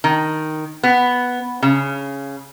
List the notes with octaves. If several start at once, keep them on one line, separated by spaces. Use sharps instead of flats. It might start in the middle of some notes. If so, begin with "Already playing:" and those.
D#3
B3
C#3